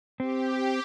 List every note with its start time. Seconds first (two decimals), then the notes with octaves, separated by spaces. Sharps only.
0.20 C4 G4